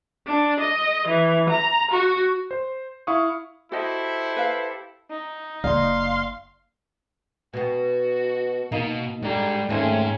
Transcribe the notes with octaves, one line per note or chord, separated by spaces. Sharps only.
D4
D#5
E3
A#5
F#4
C5
E4 F5 C#6 D#6
E4 F#4 G4 A4 C5 D#5
B4 F5
D#4
F#1 D5 F5 C6
B2 B3 F#4
B2 A#3 D#4
D3 G3 G#3 A#5
D#2 G#2 A3 C4 C#4 G#4